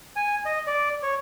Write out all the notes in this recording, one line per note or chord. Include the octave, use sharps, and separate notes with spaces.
G#5
D#5
D5
C#5